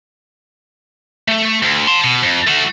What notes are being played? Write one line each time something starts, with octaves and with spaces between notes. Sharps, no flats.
A3
D2
A5 C6
B2
F2
A3 F#4